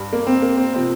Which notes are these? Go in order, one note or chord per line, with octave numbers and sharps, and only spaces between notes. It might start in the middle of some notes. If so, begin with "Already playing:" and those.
Already playing: G2 G3
A#3
C4
A#3
C4
C3 F3 C4